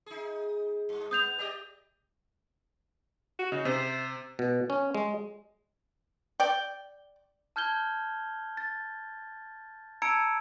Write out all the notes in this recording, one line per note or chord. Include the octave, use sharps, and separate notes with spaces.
D#4 G#4
G2
B3 D#6 G6 F7
G4 D5 D#5
F#4
C#3 D#4
C3 C5
B2
C#4
G#3
D5 G5
A5 F6 G6 G#6 G7
A6
A5 A#5 E6 G#6 C#7 D7